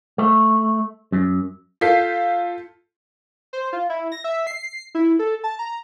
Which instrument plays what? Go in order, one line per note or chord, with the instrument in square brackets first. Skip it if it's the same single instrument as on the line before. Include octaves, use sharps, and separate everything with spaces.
[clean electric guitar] A3
F#2
[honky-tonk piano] F4 A4 G6 B6 C7
[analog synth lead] C5
F4
E4
A#6
E5
C7
E4
A4
A5
A#5